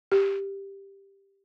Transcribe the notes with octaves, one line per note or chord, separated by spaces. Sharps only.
G4